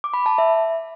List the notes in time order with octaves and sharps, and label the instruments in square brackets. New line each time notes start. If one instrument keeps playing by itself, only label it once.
[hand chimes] D6
B5
A5
E5